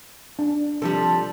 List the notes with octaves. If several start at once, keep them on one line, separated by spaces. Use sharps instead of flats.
D4
C3 F3 G3 A4